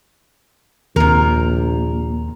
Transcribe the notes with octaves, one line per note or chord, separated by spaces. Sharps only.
A#1 D#2 C3 A#3 A#4